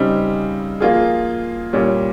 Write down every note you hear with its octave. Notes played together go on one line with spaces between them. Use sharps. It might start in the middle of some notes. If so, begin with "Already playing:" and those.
Already playing: C#3 G3 C4 D#4
F3 A#3 F4 G#4
A#2 G3 C#4